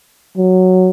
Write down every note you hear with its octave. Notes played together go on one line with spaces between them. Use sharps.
F#3